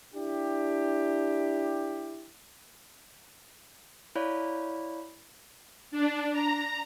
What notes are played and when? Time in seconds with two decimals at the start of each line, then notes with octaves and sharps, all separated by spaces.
0.13 D4 E4 G4
4.15 E4 C#5 D5 F5 B5
5.92 D4
6.32 A#5